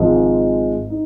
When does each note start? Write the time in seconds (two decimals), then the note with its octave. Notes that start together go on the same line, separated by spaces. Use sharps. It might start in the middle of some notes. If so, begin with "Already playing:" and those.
Already playing: G#1 G#2 F3 G#3
0.90 D#4